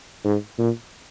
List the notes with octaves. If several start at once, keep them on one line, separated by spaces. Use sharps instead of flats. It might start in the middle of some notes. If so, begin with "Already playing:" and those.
G#2
A#2